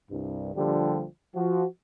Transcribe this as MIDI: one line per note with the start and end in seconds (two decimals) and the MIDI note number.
0.11 0.53 36
0.11 0.53 43
0.56 1.06 34
0.56 1.06 50
0.56 1.06 53
0.56 1.06 55
0.56 1.06 67
1.36 1.65 53
1.36 1.65 66